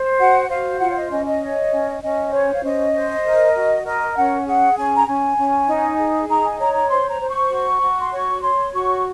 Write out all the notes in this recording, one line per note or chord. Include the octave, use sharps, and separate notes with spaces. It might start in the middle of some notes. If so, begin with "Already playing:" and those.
Already playing: C5
F#4 F#5
C5 F5
F4 F#5
C#5
D#5
C#4 D#5
D#5
C#5
C#4
C#4 D#5
C5 C#5
F5
C#4 D#5
C5
A#4
F#4
A#4 D#5
C#4 F#5
G#4 F#5
C#4 G#5
A#5
C#4 G#5
C#4
D#4
G#4
D#4 A#5
G#5
C#5 A#5
A#5
C5 C6
A#5
C5
C#6
F#4
F#4
C6
C#5 C#6
C#5 C6
F#4 C#6